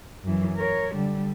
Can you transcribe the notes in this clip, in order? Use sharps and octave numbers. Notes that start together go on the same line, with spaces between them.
F#2 E3
A#4 C#5
D3 G3